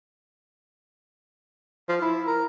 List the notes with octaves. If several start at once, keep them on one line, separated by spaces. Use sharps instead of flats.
F3
E4
A#4